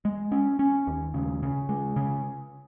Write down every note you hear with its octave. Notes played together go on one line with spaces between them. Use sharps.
G#3
C#4
C#4
D#2
C#3
C#3
G#3
C#3